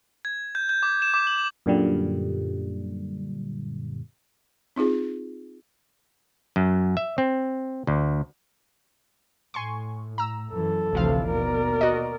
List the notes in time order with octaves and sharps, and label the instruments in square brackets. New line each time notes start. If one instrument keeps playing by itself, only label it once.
[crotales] G#6
G6
G6
D6
E7
D6
F#7
[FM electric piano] F#2 A#2 D3 G3
[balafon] C4 D#4 F4 G#4
[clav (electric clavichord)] F#2
E5
C4
D2
[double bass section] A2 [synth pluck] G#5 C6 C#6
[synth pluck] A#5 E6
[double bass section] F#2 E3 [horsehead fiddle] A4
[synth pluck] A1 F3 F5 [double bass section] D2 C3 E3
[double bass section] D#2 B2 [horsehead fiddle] A#4 D5
[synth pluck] F#4 D#5